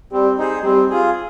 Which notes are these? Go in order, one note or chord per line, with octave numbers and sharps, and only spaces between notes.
G3 C4
D#4 G#4 C5
G3 C4
F4 G#4